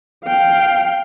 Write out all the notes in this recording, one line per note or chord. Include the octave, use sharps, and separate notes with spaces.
F5 G5